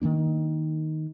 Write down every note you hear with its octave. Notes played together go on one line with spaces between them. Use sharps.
D#3 F3 A#3 D4